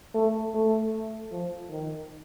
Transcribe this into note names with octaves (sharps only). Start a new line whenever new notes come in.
A3
A3
F3
D#3